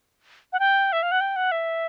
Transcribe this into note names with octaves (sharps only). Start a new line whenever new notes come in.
F#5
G5
E5
F5
F#5
G5
F#5
E5